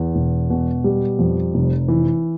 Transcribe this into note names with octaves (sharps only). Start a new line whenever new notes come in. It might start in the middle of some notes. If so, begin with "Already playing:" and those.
Already playing: E2
E1
B2
G3
F2
F1
E3